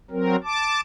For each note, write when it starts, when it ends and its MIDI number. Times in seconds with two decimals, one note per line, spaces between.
0.11 0.36 54
0.11 0.36 60
0.11 0.36 70
0.44 0.81 81
0.44 0.81 86